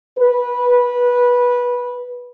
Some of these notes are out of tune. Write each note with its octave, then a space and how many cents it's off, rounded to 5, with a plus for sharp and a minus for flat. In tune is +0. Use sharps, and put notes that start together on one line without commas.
B4 -15